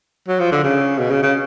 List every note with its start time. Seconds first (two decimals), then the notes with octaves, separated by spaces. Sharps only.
0.28 F#3
0.40 F3
0.52 D3
0.64 C#3
0.99 B2
1.11 C#3
1.23 C#3